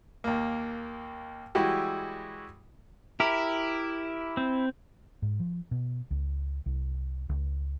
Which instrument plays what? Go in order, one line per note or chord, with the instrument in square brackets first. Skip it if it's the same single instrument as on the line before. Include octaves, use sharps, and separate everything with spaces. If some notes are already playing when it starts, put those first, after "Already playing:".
[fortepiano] D#2 A#3
E3 G3 G#3 E4 F#4 G4
[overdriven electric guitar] E4 [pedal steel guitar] G4 A#4
[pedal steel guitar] C4
[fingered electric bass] G#2
F3
B2
C#2
C2
C#2